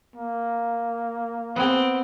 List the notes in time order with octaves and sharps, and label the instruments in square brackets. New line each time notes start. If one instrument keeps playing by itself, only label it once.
[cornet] A#3
[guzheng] B3 G#4 [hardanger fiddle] C4